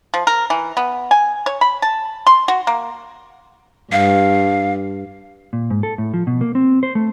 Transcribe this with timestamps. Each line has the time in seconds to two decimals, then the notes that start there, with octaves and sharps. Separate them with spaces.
0.14 F3
0.27 A#4
0.50 E3
0.77 B3
1.11 G#5
1.46 C#5
1.61 B5
1.82 A5
2.27 C6
2.48 F#4
2.67 A#3
3.92 G2 F5
5.53 A#2
5.70 G#2
5.83 A4
5.98 A2
6.14 F3
6.27 B2
6.41 A#3
6.55 C4
6.83 C5
6.95 A3